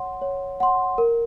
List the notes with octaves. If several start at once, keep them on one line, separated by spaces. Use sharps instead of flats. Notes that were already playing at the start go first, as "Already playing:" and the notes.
Already playing: C#5 F#5 C6
C#5
F#5 C6
A#4